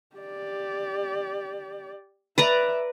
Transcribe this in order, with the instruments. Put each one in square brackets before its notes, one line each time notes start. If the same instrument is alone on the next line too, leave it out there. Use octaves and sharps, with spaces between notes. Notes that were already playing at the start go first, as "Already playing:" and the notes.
[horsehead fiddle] G4 D5
[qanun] B4 D5 A#5 [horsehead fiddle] E5